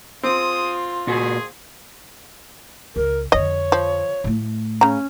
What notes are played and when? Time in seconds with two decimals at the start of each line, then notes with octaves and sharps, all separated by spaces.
0.23 C4 F4 G#4 D#6
1.07 A#2 F#4 G#4
2.96 C#2 A#4
3.32 F2 D3 C#5 D#5
3.72 F3
4.24 A2 A3
4.81 C#3 C#4 A#5